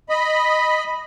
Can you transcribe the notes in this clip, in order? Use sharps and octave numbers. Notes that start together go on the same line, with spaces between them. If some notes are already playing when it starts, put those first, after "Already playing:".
D#5 B5